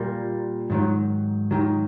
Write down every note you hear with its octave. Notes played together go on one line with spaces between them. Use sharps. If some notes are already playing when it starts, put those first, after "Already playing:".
Already playing: A#2 G3 A#3
G#2 D#3 F#3
G#2 D#3 F#3